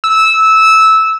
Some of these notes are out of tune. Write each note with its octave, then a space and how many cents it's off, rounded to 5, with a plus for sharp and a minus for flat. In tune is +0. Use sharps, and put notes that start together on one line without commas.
E6 -15